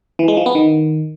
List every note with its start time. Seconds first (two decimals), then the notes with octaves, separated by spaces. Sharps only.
0.19 E3
0.28 G#3
0.37 F3
0.46 B3
0.55 D#3